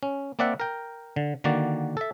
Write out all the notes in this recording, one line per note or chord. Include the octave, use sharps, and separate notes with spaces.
C#4
A#3 C4 D5 E5 F#5
A#4 G5
D3
D3 D#3 A#3 F#4 D5
A4 E5